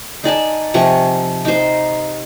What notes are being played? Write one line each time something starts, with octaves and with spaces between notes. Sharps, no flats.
D#4 D5 G#5 A5
C3 F3 G#5 C#6
D#4 C5